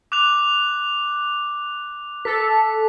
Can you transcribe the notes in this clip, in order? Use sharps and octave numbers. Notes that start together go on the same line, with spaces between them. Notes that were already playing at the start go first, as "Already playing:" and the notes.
D6 F#6 F7
A4 B6